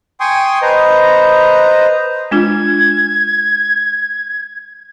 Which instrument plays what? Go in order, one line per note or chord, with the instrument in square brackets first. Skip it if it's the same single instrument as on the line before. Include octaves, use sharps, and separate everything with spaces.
[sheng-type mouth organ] G5 G#5 C6 C#6 D#6
B4 C5 D#5 A#5
[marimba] G#3 D4 F4 [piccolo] G#6